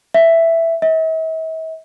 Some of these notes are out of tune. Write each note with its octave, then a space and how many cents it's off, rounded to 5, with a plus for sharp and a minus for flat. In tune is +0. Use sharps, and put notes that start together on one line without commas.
E5 +5
E5 -45